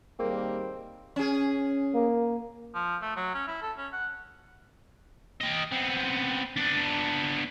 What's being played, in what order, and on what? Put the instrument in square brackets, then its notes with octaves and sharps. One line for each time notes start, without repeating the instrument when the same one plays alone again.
[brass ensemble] D#2 D#3 G3 [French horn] A#3 [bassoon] C4 [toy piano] G#4 A#4 D5
[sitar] C#4 G#4
[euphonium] A#3
[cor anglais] F3
A3
F#3
C#4
E4
A4
C#4
F#5
[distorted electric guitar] G4 D#5
B3 C4
B3 D4